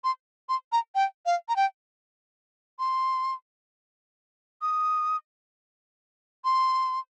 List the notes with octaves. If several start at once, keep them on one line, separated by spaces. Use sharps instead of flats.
C6
C6
A#5
G5
F5
A#5
G5
C6
D#6
C6